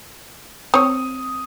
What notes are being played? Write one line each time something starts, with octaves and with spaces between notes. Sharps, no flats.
C4 C#5 D#6